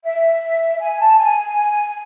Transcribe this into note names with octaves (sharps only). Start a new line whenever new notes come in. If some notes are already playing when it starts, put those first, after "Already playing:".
E5
G#5
A5
G#5